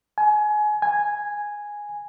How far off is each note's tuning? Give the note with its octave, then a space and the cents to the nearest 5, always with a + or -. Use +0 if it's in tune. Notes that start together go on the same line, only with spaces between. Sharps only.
G#5 +25
G#5 -5